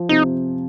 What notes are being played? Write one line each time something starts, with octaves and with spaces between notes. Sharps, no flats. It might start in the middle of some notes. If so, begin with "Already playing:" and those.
Already playing: F3
C3 D#4